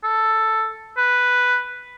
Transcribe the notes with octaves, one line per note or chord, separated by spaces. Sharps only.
A4
B4